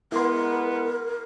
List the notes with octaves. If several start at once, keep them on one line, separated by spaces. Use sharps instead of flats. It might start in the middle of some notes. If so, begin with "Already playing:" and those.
G#3 B3 E4 A#4 C6